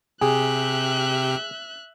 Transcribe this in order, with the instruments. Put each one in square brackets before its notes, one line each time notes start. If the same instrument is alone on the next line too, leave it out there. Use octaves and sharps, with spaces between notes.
[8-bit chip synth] C3 G4 [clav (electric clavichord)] G#4 [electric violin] E5 F#6